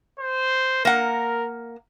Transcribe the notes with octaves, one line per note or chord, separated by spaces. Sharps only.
C5
A#3 A#4 F#5